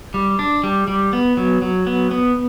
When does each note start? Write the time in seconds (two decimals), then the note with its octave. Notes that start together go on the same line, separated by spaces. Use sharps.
0.14 G3
0.39 D4
0.64 G3
0.88 G3
1.13 B3
1.37 F#3
1.62 F#3
1.87 B3
2.11 B3